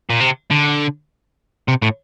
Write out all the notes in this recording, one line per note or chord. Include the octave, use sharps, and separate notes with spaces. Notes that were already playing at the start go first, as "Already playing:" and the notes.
A#2
C3
D3
C3
A2